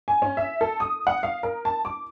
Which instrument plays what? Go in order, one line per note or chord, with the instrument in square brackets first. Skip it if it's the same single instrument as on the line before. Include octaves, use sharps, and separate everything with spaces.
[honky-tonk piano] G#5
C#4
E5
A4
D#6
F#5
F5
A#4
A5
D6